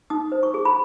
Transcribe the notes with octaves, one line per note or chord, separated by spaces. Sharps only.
D#4 D#6
C5
C#6
G#4
B5